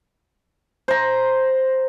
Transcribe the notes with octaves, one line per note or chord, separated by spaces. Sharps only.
C5 A#5